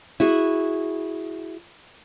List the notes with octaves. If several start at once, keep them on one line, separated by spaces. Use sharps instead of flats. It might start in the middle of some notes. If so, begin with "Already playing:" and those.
E4 F#4 G#4